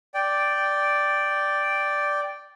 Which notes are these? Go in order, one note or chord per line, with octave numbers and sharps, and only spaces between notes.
D5 G5